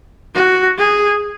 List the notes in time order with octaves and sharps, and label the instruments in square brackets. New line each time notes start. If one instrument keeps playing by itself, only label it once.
[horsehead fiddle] F#4
G#4